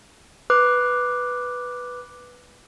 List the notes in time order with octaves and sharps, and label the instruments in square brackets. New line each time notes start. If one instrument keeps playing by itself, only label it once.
[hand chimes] B4 D6 F#6